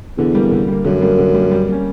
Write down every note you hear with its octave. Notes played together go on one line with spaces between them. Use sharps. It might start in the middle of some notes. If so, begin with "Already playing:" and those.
E2 D3
G3 A#3
D3
G3 A#3
F#2 D3
G3 A#3
D3
G3 A#3
G3
A#3 C#4